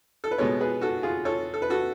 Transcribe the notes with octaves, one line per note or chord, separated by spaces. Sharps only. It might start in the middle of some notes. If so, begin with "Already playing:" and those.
A4
B4
B2 G#3 B3 A4 C#5
G#4 B4
F#4 A4
F4 G#4
A4 C#5
A4
B4
F#4 A4